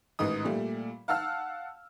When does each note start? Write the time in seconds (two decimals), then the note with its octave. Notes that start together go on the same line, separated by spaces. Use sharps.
0.19 A1 G#2 D#3 D#4 D#6
0.45 A#2 G3 A3
1.08 F5 F#5 A5 E6 F6